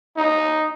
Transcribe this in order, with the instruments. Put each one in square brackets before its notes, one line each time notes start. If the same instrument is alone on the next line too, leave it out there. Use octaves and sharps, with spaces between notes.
[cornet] D#4